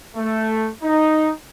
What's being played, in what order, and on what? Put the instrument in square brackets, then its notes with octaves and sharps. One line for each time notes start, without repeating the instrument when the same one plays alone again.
[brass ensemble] A3
D#4